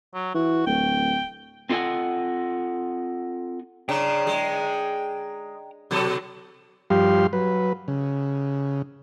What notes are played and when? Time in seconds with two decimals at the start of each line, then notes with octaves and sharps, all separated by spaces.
0.14 F#3
0.35 E3 F#4
0.67 D1 G5
1.70 C4 F4 A4 D#5 F#5 G#5
3.89 C#3 D4 G5 A#5
4.27 G#3
5.91 B2 F#3 A4
6.90 G2 F3 G3 G4 F5 C6
7.33 F#3 B4
7.88 C#3